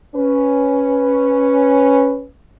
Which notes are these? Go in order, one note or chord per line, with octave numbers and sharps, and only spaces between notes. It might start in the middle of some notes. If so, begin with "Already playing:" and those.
C#4 B4